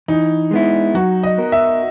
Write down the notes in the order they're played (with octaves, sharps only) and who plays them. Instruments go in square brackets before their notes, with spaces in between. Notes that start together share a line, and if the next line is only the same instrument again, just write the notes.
[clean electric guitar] E3 [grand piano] D#4
[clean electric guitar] G#3 B3 E4
[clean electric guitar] F#3 [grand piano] F#4
[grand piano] D#5
[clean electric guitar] B3 F#4 A#4
[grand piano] E5